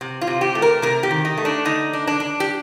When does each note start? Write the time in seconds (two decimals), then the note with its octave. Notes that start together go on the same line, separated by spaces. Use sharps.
0.01 C3
0.21 F4
0.27 C3
0.41 G4
0.55 A3
0.62 A#4
0.82 C3 A#4
1.03 G4
1.11 D#3
1.25 D#4
1.37 A3
1.45 D4
1.65 D3 D#4
1.93 D4
2.07 D4
2.20 D4
2.40 G4